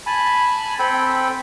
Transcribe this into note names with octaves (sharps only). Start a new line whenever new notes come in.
G#5 A5 B5
C4 A4 G5 B5